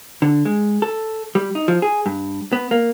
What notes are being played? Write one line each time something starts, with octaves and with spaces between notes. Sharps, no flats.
D3
G#3
A4
G3
D#4
F3
G#4
G2
B3
A#3